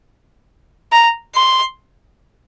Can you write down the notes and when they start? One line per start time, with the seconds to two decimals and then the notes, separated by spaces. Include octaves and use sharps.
0.92 A#5
1.35 C6